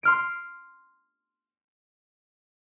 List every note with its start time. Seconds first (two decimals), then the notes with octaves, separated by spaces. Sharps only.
0.03 C6 F6 D7